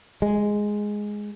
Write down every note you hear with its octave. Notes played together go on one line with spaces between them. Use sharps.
G#3